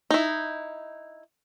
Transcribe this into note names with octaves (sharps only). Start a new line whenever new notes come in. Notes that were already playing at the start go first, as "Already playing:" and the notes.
D#4 E4